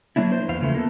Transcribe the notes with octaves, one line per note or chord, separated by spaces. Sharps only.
F#3 A#3 D4 E4
C5
E2 F5
C#3 E3 F3 A3
A#3 B3 A4